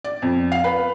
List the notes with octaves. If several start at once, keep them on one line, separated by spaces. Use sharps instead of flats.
D5
F2
F5
B4